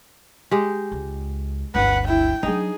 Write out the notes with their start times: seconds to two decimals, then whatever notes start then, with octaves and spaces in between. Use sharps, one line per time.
0.51 G#3 G4
0.92 C#2
1.75 G1 D2 B4 F#5
2.07 E4 G5
2.43 F#3 D4 D#4 G#4